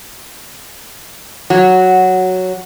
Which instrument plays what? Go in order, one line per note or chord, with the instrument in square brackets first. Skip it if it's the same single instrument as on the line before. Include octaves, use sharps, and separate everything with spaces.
[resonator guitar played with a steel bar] F#3